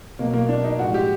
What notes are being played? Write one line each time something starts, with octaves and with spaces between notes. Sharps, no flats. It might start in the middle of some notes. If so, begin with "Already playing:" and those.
B2 F#3 A#3
A#3
D4
D#4
A2 F3 G#3 F#4
G4